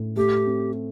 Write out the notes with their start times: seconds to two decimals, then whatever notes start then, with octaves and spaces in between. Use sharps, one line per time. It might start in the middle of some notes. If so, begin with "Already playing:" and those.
Already playing: A2
0.17 A3 G4
0.46 C4